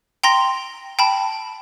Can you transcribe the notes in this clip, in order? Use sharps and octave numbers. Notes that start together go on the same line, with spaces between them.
G5 A#5 C6 A#6
G5 A5 B5